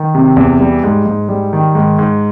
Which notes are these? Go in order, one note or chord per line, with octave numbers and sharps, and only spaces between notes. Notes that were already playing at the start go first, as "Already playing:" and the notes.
Already playing: D#3
C3
E2
G3
G#2
G#2
G3
D#3
G#2
G#2